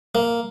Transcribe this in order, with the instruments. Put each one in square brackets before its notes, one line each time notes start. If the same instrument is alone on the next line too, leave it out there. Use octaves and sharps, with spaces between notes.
[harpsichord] A#3